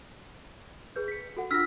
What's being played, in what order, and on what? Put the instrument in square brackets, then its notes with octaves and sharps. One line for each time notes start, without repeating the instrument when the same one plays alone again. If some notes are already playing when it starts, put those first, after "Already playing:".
[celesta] G#4 B4 G6
B6 C#7
F#4 A4 F#5
[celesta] D4 F4 A#6 [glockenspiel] E6 F6 B6